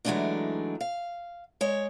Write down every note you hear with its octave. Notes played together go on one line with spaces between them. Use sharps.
E3 F#3 G#3 A3 D4 D#4
F5
G#3 C#5